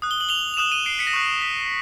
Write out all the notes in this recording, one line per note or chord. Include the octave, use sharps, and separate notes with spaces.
D#6 F#6
G7
F#7
F7 G7
F7
D#6 F#6 E7 F#7
D#7 F7
C7 D7
B6 C#7
A#6
C#6 F#6 B6
B6